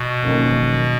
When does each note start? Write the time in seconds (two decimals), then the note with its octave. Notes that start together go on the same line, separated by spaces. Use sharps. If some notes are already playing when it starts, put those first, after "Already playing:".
Already playing: B2
0.21 F#1 F2 D#3 A#3 C#4